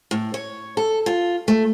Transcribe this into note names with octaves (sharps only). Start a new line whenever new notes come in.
A2
C#5
A4
F4
A3